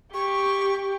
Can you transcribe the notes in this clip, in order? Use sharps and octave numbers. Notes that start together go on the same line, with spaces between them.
G4 C#6